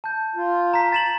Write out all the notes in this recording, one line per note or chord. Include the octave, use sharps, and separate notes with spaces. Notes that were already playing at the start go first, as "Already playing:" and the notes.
A5 G6
F4
A#5 B6
A6 E7 F#7